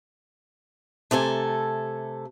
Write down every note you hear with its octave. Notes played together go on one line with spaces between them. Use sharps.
C3 A3 A4 G#5